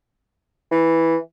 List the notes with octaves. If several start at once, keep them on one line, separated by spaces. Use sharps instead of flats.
E3